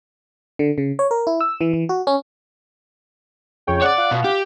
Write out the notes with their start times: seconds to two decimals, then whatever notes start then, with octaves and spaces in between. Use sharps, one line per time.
0.59 D3
0.78 C#3
0.99 C#5
1.11 A#4
1.27 E4
1.41 E6
1.61 E3
1.73 E3
1.89 F#4
2.07 C#4
3.67 F2 C#3 C#5 G5
3.82 C#5 D5 F#5
3.98 F4
4.12 B2
4.25 G4